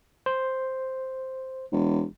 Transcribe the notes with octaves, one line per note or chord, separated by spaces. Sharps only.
C5
E1